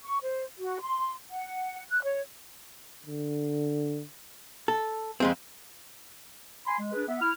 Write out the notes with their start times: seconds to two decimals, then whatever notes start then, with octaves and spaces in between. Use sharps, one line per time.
0.03 C#6
0.22 C5
0.58 F#4
0.81 C6
1.30 F#5
1.88 F#6
2.03 C#5
3.06 D3
4.68 A4
5.20 F2 G#3 C4
6.66 G#5 B5 C6
6.77 G#3
6.92 D4 G#4 B4
7.08 B3 E5
7.21 E4 F6